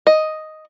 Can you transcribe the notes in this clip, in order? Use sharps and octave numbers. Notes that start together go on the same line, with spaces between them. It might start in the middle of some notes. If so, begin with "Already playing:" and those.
D#5